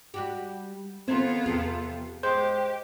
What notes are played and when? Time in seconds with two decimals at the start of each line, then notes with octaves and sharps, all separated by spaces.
0.14 G3 F#4 G4
1.08 D#3 B3 C4 F4 A4 C5 G#6
1.46 E2 C3 F3 G#4
2.23 G#3 G4 C5